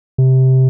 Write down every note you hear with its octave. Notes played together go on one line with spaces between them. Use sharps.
C3